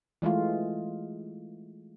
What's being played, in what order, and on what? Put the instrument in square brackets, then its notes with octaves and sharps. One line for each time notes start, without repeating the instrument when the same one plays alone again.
[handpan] E3 G#3 A3 F4